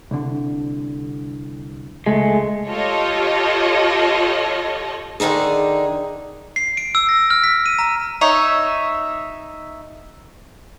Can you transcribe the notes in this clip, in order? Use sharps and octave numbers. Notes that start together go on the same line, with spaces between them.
C2 D3
C#2 G#3 A3
F4 G4 A4 C#5 D#5
D3 D#3 D4 D#4 G#4
C7
D7
E6
A#6
F6
B6
D#7
A#5
D#4 C#5 E5